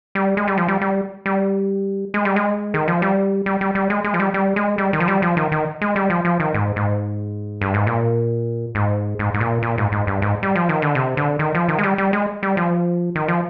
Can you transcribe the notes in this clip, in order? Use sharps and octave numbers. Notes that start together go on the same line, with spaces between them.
G3
G#3
G3
F3
G3
G3
G3
G#3
G3
G#3
D#3
F3
G3
G3
G3
G3
G#3
G#3
F3
G3
G3
G#3
G3
D#3
F3
G3
F3
D#3
D#3
G#3
G3
F3
F3
D#3
G#2
G#2
G2
G#2
A#2
G#2
G#2
G#2
A#2
A#2
G#2
G#2
G2
G#2
G3
F3
D#3
D3
C3
D3
D#3
F3
D#3
G#3
G3
G3
G#3
G3
F3
D#3
F3